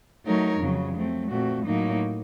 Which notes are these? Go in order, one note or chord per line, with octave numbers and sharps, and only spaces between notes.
F#3 A3 D#4 A#4 C#5
F2 C#3 F#3
F#3 A3 C4
A#2 A3 C4 F#4
A2 F#3 A#3 D#4